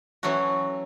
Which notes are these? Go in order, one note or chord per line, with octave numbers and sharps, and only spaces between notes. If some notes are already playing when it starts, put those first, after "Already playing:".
E3 F#3 A3 C#4 F#4